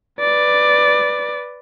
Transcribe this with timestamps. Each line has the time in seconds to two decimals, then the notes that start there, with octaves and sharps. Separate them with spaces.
0.20 B4 D5